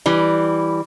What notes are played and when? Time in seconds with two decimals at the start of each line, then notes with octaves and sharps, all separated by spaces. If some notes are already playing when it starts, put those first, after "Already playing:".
0.06 E3 G3